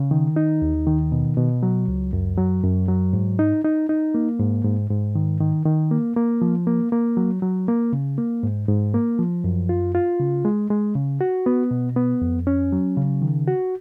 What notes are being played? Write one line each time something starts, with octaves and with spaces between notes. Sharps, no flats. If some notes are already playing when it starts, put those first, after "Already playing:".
Already playing: C#3
D#3
D#4
D#2
D#3
B2
B2
F#3
C#2
F#2
F#3
F#2
F#3
G#2
D#4
D#4
D#4
A#3
G#2
G#2
G#2
D#3
D#3
D#3
A#3
A#3
F3
A#3
A#3
F#3
F#3
A#3
C#3
A#3
G#2
G#2
A#3
F3
F#2
F4
F4
C#3
G#3
G#3
C#3
F#4
B3
B2
B3
F2
C#4
F#3
C#3
D#3
F#4